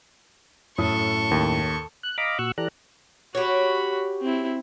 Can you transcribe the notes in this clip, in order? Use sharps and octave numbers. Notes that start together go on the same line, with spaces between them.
F#2 A2 A4 C#6 D#6
D#2
F#6
D#5 F5 A#5 B5 D6
A#2 F#4 C#6 E6 F#6
E3 G4 A4 D5 A#5 F#6
F#4 G4 C#5 B5
C4 E4